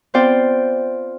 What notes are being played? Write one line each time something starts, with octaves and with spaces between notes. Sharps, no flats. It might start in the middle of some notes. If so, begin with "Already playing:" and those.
B3 C4 F4 C5 D5 G5